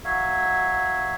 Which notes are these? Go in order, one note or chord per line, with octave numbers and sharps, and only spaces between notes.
F#3 C#5 E5 F5